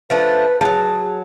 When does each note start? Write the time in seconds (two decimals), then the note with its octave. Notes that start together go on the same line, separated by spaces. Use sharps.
0.10 F3 A3 D4 B4
0.61 F3 F#3 G#4 A5